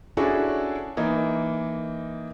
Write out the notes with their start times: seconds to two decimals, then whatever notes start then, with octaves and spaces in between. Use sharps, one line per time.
0.17 C#4 D4 E4 F#4 G#4 A4
0.97 E3 A#3 D#4